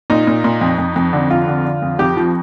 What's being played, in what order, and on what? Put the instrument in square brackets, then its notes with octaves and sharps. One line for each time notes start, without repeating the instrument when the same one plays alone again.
[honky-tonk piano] A#2 D#4
A#2
A#2
F2
F2
F2
D3
F2 F4
D3
D3
F2
F2 G4
F3